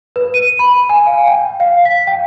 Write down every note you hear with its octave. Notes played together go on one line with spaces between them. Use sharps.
B4
D#7
B5
G#5
F5
G5
F5
B6
G5